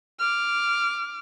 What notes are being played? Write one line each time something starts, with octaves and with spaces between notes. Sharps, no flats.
D6 F6